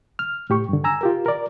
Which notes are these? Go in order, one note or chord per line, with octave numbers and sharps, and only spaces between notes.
F6
A2 G4 C#6
G2 D3
G#5 A#5 E6
F4 G4 A#4
A#4 D5